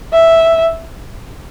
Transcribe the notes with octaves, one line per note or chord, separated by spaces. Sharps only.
E5